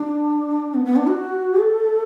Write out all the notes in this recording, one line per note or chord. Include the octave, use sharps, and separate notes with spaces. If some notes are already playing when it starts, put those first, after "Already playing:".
Already playing: D4
B3
B3
D4
F#4
A4